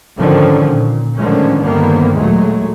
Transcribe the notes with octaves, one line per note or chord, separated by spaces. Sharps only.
G#2 D3 D#3 F3 C#4
A#2
A2 D3 D#3 F3 G#3 C#4
G2 D3 D#3 F3 A#3 B3
D#2 A#2 F#3 G#3 A3